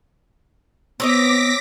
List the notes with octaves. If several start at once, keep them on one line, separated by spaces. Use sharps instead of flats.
B3 C4 C#5 D#5 D6 A#6 B6